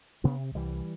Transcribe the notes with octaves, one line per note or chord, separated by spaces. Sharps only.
C3 B3 D4
C2 E3 G3